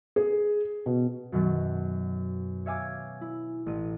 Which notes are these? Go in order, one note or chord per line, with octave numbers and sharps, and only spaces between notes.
G#4
B2
F#2 B2 D#3 F#3
C#5 E5 F5 G#5 D6
E4
A1 D#7